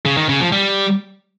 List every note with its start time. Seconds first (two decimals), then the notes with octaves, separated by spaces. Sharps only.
0.06 C#3
0.17 D#3
0.29 C#3
0.41 F3
0.52 G3